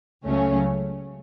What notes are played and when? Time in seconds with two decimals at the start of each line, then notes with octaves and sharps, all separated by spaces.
0.25 C#2 C#3 F#3 A3 C#4